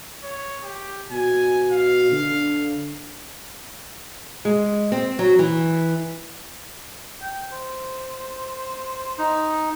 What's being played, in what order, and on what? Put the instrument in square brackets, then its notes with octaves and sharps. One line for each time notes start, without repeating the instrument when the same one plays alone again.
[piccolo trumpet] C#5
G4
[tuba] B2 [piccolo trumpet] G#5
[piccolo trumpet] F5
[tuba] D3
[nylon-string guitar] G#3
C4
F#3
E3
[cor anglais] G5
C5
[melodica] D#4